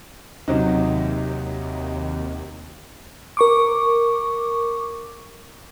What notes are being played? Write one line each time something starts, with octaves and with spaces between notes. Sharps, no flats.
D#2 C3 F#3 D#4
A#4 C#6 D6